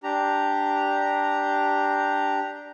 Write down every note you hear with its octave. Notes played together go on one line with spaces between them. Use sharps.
D4 G4 A#5